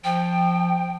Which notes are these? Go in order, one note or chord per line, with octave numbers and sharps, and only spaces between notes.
F3 G5